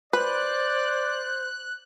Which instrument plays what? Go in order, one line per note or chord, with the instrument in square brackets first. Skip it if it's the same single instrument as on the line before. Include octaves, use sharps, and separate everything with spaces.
[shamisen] B4 [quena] C5 [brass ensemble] D5 [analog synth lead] F#6